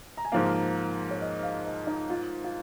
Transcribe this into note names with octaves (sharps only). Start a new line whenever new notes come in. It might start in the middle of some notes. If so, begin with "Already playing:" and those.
A#5
G#5
G#2 F3 A#3 F5
C#5
D#5
F5
D#5
D#4
F4
F4